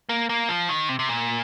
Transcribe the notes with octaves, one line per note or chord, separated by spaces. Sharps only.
A#3
A#3
F3
D#3
C3
C3
A#2